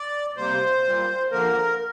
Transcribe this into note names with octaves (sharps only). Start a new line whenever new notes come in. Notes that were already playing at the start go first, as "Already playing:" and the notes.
Already playing: D5
C3 G3 A#3 C5
A#2 G3 A#3
D3 F3 A#3 A#4